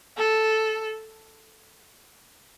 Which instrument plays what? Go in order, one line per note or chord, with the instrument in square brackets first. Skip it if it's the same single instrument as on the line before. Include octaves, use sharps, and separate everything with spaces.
[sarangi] A4